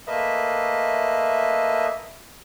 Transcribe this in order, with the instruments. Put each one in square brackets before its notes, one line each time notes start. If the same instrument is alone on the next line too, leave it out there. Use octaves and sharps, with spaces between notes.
[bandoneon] A3 A#3 B4 D#5 E5